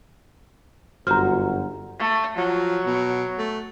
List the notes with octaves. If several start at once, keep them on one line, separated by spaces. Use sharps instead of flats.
G1 F#2 F#4 C5 A#5 F6
A3
F3 F#3
B2
A3